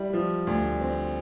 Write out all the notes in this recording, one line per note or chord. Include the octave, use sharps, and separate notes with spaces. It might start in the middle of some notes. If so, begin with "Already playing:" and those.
Already playing: G3 E4
F3
D2
C4